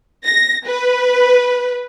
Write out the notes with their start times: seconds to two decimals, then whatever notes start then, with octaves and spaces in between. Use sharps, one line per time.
0.25 A#6
0.67 B4